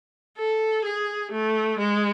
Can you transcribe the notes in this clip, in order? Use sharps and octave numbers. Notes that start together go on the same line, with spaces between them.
A4
G#4
A3
G#3